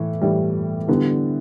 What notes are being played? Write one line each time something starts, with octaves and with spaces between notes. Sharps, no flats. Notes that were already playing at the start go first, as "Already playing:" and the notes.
Already playing: A2 E3
A2 E3 G3
D3 G3 B3 E4